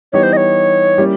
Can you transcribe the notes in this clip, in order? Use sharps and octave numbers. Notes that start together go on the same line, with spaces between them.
E3 G3 B3 D#4 G4 C#5
C5
D#5
C#5
G3 A#3 C#4 E4 G4